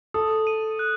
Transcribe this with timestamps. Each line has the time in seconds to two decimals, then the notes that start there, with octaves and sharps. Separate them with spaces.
0.14 A4 D#6
0.47 D#7
0.79 F#6